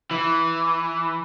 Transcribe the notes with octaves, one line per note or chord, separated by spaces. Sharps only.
E3